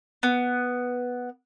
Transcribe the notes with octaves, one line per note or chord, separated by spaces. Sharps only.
B3